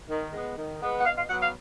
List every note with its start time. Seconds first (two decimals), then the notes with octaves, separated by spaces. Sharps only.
0.09 D#3
0.33 G#3 B3
0.57 D#3
0.82 G#3 B3
0.99 F#5
1.06 B2 F5
1.18 F5
1.30 F#3 B3 F#5
1.42 F5